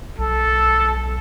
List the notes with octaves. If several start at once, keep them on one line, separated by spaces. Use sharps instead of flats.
B1 A4